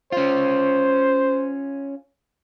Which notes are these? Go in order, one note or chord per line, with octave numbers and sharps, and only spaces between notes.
C#4 F4 C5